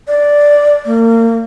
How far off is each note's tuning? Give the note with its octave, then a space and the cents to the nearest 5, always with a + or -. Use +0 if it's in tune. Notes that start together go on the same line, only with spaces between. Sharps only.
D5 -5
A#3 -35